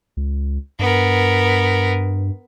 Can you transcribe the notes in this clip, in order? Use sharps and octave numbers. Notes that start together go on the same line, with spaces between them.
C#2
G2 B3 A#4